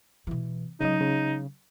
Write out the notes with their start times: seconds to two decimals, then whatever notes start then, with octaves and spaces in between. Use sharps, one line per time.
0.27 B2 E3
0.81 C#3 F#3 G#3 D#4 D#5
1.01 C#3